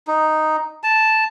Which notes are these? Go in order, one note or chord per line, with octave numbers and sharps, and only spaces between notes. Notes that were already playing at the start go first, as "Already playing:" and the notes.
D#4
A5